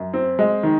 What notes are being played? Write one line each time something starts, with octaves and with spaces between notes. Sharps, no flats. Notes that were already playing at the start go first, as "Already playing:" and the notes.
Already playing: F#2
C4
G#3
D#3